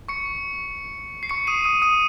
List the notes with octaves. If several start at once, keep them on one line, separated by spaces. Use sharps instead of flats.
C#6 C#7
C7
C#6 C#7
D#6 D#7
D#6 D#7
D#6 D#7